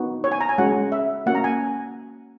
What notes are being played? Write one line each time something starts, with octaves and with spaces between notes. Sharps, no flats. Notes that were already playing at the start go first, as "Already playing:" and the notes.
Already playing: B3 D#4 F#4
C#5
G#5
A#5
G#5
G#3 C#4 F#4 F#5
E5
A#3 C#4 F#4 F#5
A#5
G#5